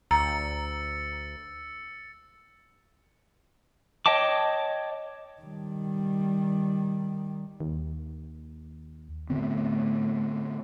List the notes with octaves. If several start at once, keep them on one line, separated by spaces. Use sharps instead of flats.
D2 A#5 E6 A6 C#7
C#5 D#5 G5 A5 D6
D#3 G3
D#2
A2 D3 B3 C4